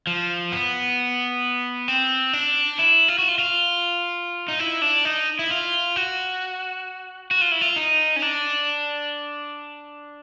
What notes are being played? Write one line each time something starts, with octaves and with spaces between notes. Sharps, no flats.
F3
B3
C4
D4
E4
F4
F#4
F4
F4
D#4
E4
D4
D#4
E4
F4
F#4
F#4
F4
E4
F4
D#4
C#4
D4